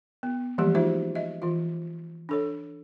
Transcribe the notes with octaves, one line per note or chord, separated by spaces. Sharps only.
B3
E3 F3 G3 G#3 A#3 G4
D#4 F4 F#4 C5 E5
D#5 E5
E3 F4
D4 A4 C#5